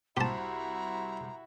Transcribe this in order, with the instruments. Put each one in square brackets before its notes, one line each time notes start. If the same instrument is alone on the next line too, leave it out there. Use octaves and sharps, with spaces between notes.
[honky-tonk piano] C2 C5 [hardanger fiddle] E4 F#4 [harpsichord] G4 A5 [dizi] A#5